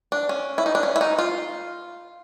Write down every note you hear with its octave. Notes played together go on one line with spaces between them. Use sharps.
D4
C#4
E4
D#4
D4
C#4
E4
D#4
F4